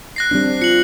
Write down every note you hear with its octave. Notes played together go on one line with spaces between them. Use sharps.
F#6 A#6 C7
G3 C4 D4
F4 C#7 F#7